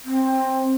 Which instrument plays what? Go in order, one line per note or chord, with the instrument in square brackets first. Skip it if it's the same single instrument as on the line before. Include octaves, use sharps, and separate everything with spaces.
[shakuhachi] C4